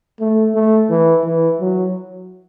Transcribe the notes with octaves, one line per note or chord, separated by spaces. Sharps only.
A3
A3
E3
E3
F#3